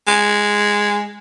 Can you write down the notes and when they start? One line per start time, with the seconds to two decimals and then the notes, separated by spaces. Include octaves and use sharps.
0.07 G#3